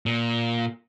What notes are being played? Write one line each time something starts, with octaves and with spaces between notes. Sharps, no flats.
A#2